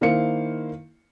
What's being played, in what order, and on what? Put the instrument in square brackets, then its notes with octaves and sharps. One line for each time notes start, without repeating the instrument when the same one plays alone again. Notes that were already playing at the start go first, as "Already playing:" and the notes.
[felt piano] D#3 A#3 E4 C5 F5 C#7